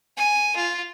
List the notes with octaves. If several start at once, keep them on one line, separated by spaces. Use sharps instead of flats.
G#5
F4